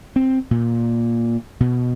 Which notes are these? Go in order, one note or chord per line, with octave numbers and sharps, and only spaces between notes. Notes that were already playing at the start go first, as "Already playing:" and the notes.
C4
A#2
B2